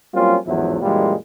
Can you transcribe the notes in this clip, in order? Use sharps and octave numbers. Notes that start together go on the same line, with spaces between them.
F#3 G3 A#3 C4 C#4 F4
A1 E2 G#2 F3 F#3 E4
F#2 A#2 E3 G3 G#3